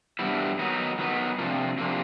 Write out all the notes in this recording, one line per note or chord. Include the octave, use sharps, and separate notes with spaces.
G2 E3 G3 B3 E4
D#3 F#3 B3 D#4
D#3 F#3 B3 D#4
C3 F3 A#3 D4 F4
C3 F3 A#3 D4 F4